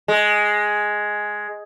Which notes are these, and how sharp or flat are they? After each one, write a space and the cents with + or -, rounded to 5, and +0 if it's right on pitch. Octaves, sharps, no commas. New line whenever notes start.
G#3 +5